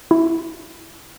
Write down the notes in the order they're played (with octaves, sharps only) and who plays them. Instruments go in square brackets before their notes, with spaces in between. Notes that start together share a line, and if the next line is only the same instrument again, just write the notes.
[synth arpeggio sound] E4